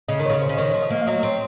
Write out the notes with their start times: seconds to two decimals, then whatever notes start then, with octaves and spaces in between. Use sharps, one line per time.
0.08 C#3 D#5
0.20 D#3
0.25 C#3 C#5
0.42 C5
0.49 C#3
0.57 D#3 C#5
0.70 D#5
0.74 F3
0.83 D#5
0.90 A#3 F5
1.01 F5
1.07 F#3 D#5
1.23 C4 C#5